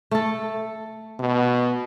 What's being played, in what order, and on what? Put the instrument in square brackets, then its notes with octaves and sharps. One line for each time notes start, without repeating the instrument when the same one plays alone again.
[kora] A3 A4
[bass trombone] B2